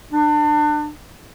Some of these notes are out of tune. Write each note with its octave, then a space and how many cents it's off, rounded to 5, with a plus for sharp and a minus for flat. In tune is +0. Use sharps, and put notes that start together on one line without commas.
D4 +30